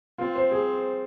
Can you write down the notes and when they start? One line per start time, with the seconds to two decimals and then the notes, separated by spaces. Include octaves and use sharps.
0.18 C4 F4
0.35 C5
0.51 G#4